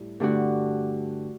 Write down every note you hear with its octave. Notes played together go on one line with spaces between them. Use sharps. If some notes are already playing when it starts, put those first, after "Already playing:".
Already playing: A2 G3
G2 D3 A3 D4 F#4